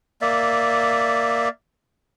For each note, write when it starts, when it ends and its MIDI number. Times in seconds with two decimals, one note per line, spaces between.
0.21 1.49 58
0.21 1.49 74
0.21 1.49 76